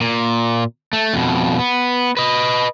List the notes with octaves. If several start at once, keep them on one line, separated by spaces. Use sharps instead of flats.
A#2
A3
F2 B2
B3
B4 D#5